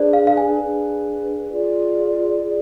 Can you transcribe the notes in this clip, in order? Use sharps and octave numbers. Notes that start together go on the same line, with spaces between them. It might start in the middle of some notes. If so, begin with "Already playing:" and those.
Already playing: D4 G#4 B4 C5 D5
F5
F5
G#5
D4 G#4 B4
F4 G#4 D5
F4 G#4 D5